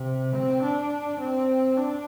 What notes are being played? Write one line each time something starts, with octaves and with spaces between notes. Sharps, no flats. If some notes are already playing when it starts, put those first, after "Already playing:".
Already playing: C3
C4
D4
C4
D4